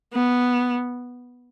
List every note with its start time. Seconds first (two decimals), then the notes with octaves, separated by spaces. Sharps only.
0.13 B3